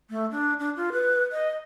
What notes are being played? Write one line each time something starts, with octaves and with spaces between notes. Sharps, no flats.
A3
D4
D4
F4
B4
D#5